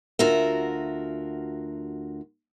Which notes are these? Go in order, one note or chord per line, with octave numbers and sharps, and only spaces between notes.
D2 F4 F#4 A#4 E5